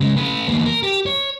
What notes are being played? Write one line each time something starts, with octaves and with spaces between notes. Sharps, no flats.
C#3 G#3
A3 B4
E2 A#3
A#4
G4
C#5